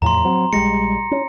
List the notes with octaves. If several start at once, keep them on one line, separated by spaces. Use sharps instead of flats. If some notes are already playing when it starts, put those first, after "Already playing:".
E2 A2 F3 A#5 C6
F#3 C4
A#1 G3 G#3 A#6 C#7
C#4